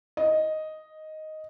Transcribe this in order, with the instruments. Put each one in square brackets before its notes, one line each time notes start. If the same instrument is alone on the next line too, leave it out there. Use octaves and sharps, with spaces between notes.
[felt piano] D#5